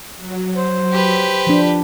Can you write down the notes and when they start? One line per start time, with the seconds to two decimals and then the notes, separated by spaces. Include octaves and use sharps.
0.17 F#3
0.56 C5
0.93 G4 B4
1.47 F3 D4